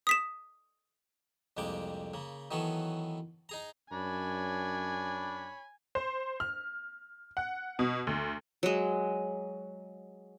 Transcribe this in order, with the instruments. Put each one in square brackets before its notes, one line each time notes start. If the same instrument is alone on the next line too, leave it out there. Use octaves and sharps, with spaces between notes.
[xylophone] D#6 B6 E7
[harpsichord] C2 F2 G#3 A#3 G5 D6
C#3 A#3
D#3 E3 F#3 B3 C#4 A4
D#4 G#4 A#5
[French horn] F#2 [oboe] D4 [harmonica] C#5 B5 [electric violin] G#5
[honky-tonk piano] C5
F6
F#5
B2
D2
[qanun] F#3 G#3